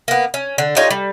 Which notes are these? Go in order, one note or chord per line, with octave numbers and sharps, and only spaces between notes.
A#3 B3
C#4
D3
D#4 F4 G4 C#5
G3